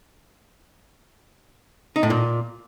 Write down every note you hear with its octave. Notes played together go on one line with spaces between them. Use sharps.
D#4
A2
A#2